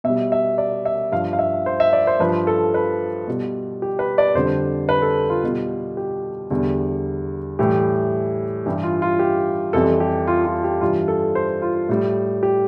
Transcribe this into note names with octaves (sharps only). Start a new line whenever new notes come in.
B2 E5
G3
E5
D5
E5
G2 F3 F5
F5
E5
C5
E5
D5
C5
G2 F3 B4
A4
B4
B2 G3
G4
B4
D5
F2 D3 G3 C5
B4
A4
F4
B2 G3
G4
E2 D3 G3
A2 E3 G3 G4
G2 E3 G3 G4
F4
F4
G4
F2 E3 G3 A4
G4
F4
F4
G4
G2 E3 G3 F4
A4
C5
F4
A2 G3
G4